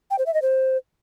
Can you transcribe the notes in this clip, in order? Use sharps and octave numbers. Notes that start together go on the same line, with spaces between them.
G5
C5
E5
D#5
C5